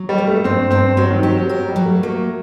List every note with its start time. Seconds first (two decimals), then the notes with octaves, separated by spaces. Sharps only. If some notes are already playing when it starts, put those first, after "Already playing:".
Already playing: F#3
0.09 G3
0.18 A#3
0.27 A3
0.44 G2 C4
0.71 G2 C4
0.97 F#3 C4
1.11 D#3
1.23 F#3 G4
1.37 F#3
1.49 F#3 A#4
1.68 G3
1.76 F#3
1.85 A3
2.03 A3 A#3